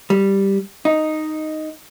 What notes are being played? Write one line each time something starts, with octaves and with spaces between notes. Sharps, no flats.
G3
D#4